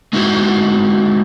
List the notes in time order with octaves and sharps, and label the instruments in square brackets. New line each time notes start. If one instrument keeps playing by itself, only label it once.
[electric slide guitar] G#3 D#4 E4 F#4 C5